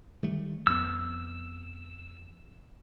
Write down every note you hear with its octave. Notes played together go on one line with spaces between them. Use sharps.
D#3 G3 A3
F2 B3 E6